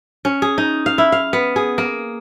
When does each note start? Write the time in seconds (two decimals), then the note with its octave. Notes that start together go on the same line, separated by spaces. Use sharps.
0.25 C#4
0.42 G#4
0.58 D#4
0.86 F5
0.98 E4
1.12 F5
1.33 B3
1.56 G#4
1.78 A#3